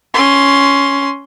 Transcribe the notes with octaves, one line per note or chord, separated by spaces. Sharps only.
C#4 C6